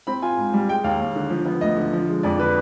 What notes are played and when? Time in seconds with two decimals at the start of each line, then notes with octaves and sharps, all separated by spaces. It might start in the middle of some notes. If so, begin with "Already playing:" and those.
0.07 C4 B5
0.22 F4 G#5
0.37 G#2
0.53 G3
0.68 G#3 G5
0.84 D#2 F5
1.00 D#2
1.16 D3
1.30 F3
1.46 B3
1.61 D2 D#5
1.76 D3
1.93 F3
2.08 G#3
2.23 F2 D5
2.38 D3 B4